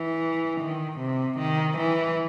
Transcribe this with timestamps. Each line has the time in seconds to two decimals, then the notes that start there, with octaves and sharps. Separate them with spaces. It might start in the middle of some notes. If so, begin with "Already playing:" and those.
Already playing: E3
0.61 D#3
1.00 C3
1.39 D#3
1.78 E3